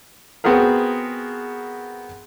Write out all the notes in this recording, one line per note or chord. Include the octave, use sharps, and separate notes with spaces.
B3 C4 F#4 G#4 A#4